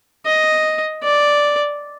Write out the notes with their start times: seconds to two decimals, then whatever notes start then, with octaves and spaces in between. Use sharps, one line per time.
0.26 D#5
1.04 D5